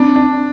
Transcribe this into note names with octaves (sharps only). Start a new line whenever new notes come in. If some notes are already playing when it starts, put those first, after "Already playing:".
Already playing: C4 D4
D4